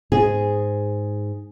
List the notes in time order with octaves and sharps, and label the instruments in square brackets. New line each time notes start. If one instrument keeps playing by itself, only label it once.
[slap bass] G#2 [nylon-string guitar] G#4